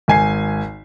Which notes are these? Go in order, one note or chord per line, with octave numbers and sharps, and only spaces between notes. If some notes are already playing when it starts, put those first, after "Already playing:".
G#1 G#5 C7